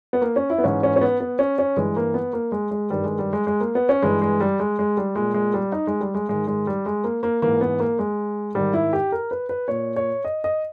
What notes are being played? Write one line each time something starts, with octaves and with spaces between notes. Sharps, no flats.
B3
A#3
C#4
E4
B3
G#2 E3 C#4
C#4
C#4
B3
B3
C#4
C#4
G2 E3 G#3
A#3
B3
A#3
G#3
G#3
G2 D#3 G3
G#3
G3
G#3
G#3
A#3
B3
C#4
G2 E3 G#3
G#3
G3
G#3
G#3
G3
A#2 G#3
G#3
G3
D#4
G#3
G3
G#3
G#2 D#3 G#3
G#3
G3
G#3
A#3
A#3
G#2 E3 A#3
B3
A#3
G#3
G#2 D#3 G3
E4
G4
A#4
B4
B4
A#2 C#5
C#5
D#5
D#5